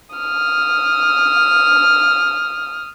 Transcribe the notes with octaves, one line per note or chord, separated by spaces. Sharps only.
D#6 F6